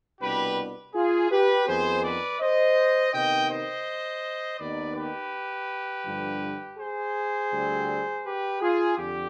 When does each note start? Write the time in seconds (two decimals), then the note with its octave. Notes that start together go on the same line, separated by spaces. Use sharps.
0.21 C2 B2 B3 D4 G4 B4
0.95 F4 G#4
1.31 G4 B4
1.68 F2 D#3 B3 G#4 C5
2.04 B4 D5
2.41 C5 D#5
3.13 C3 D#3 B3 D#4 D#5 G5
3.50 C5 D#5
4.60 D#2 D#3 B3 D#4 B4 D5
4.96 G4 B4
6.05 G2 D3 F3
6.78 G#4 C5
7.51 D2 D3 G3 C4
8.23 G4 B4
8.61 F4 G#4
8.97 F2 D3 G4